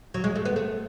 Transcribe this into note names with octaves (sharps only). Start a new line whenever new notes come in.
F#3
G#3
A3
B3
A3